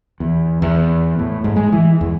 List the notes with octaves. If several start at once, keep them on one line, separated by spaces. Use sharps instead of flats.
E2
E2
A2
G#2
G#3
E3
E2